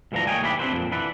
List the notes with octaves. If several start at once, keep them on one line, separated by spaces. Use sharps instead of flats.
D2 G2 E3 F3 D4 A#5
A#3 C#5 D#5 F5 G5 G#5
D#2 A2 E3 D4 G4 B5
C4 D4 E4 F4 B4 C5
F2 A#2
D3 E3 B4 D5